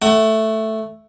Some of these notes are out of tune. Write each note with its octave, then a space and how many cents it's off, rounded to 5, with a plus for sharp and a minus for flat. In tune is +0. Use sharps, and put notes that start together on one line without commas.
A3 +0 F#5 +35